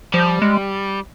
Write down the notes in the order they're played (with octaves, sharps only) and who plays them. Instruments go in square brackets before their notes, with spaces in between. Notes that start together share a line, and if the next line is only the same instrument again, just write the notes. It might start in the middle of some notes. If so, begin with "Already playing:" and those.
[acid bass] F3 [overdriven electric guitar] G3
[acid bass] G#3